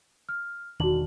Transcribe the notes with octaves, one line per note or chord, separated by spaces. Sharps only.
F6
E1 D#3 D4 F#4 F#7